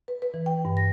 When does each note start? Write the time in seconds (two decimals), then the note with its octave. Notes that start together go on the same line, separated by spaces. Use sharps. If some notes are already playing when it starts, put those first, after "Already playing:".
0.08 B4
0.22 B4
0.34 E3
0.46 G5
0.65 G2
0.77 A#6